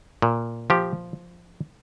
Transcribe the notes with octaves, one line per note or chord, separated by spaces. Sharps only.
A#2
F3 G4